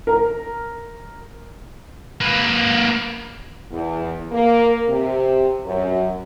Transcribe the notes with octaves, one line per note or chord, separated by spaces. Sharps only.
A#4 A#5
A#3 B4
E2
A#3
C3
F#2